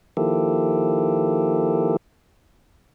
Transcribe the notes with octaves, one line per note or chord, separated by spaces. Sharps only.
D#3 F3 A#3 E4 G4 A4